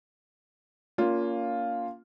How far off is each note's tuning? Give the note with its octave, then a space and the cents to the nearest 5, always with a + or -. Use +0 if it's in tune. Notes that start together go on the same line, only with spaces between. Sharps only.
A#3 +0 C#4 +35 F4 +0